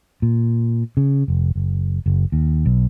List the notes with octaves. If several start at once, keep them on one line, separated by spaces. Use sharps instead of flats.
A#2
C#3
F1
F#1
F#1
D#2
B1